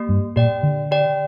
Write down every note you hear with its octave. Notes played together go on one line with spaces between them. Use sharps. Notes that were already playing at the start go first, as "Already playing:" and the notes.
Already playing: A#3 G4
G2
A#2 G4 D5 G5
D3
G4 D5 G5